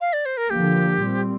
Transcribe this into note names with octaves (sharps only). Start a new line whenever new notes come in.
F5
D5
C5
A#4
D3 F3 A#3 G4
A#2 G3 C4